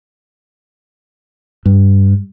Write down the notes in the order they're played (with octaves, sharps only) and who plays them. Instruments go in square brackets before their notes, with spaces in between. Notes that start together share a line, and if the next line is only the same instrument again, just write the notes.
[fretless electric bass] G2